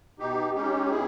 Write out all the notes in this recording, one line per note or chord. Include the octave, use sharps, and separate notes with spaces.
B2 D#4 G4
G#3 C#4 D#4 G4
B2 E4 G#4